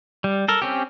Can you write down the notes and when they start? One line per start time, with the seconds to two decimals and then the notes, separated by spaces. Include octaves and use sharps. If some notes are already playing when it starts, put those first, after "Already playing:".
0.24 G3
0.48 A4 A#4
0.62 C4 C#4 G4